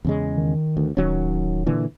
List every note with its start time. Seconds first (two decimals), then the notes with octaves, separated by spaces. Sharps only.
0.05 E2 C#3 G#3
0.37 D#3
0.77 D2
0.97 D1 D#3 F#3 C#4
1.67 A#2 D3 E3